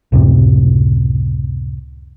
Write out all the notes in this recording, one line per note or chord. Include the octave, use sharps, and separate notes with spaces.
C#2 F#2 A2 C3